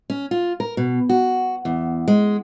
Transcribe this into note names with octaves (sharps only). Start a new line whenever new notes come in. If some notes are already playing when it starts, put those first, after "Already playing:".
C#4
F4
A#4
B2
F#4
E2
G#3